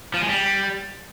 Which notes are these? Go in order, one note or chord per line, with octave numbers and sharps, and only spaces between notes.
F3
G#3
G3